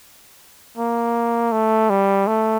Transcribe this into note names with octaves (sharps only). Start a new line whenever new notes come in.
A#3
A3
G3
A3